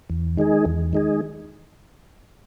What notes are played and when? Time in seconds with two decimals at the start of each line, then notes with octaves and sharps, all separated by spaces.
0.10 E2
0.37 D#3 G#3 D#4 G#4
0.65 E2
0.93 D#3 G#3 D#4 G#4